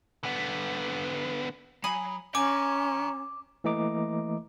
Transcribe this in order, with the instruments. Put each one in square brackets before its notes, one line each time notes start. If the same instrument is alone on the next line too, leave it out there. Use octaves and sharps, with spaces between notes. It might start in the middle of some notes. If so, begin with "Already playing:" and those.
[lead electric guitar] D3 B3
[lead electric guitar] F#3 [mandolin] G#5 B5 D#6
[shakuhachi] C#4 [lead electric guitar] G5 A#5 [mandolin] G#5 [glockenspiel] D6
[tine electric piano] E3 A3 A#3 D#5 A#5 D6